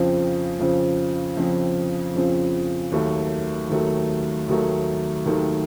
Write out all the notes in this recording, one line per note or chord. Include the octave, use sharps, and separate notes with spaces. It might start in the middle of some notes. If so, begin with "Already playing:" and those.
Already playing: F2 C#3 F3 C4
F2 C#3 F3 C4
F2 C#3 F3 C4
F2 C#3 F3 C4
D#2 D#3 F#3 A3
D#2 D#3 F#3 A3
D#2 D#3 F#3 A3
D#2 D#3 F#3 A3